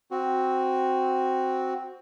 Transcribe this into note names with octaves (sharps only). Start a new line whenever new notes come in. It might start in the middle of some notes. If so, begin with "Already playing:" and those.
C4 F#4